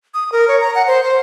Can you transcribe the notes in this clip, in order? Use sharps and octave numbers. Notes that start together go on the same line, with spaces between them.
D#6
A#4
C#5
A#5
F#5
C5
C5